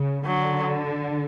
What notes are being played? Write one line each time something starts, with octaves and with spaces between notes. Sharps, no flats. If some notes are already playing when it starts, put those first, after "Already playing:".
Already playing: C#3
D3 F#3